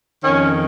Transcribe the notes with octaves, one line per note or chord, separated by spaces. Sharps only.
F2 D#3 C#4